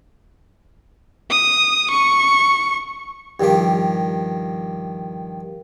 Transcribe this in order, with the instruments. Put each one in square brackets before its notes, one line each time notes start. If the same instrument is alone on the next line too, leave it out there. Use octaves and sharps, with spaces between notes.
[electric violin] D#6
C#6
[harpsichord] G2 D#3 F3 G4